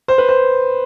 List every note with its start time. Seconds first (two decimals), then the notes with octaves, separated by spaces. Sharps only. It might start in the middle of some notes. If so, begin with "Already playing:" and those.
0.08 C5
0.18 B4
0.29 C5